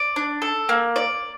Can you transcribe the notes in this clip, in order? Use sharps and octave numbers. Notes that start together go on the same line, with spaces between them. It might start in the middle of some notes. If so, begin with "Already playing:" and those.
Already playing: D5
D4
A4
A#3
D5